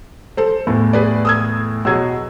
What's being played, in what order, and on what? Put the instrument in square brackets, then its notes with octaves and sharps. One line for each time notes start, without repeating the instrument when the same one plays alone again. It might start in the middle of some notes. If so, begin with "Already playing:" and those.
[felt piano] A4 C5
[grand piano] E2 A2 [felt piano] A3
[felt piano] G#4 B4 D5
D#6 E6 G#6
[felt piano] B2 F#3 G#4 [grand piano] E6 G#6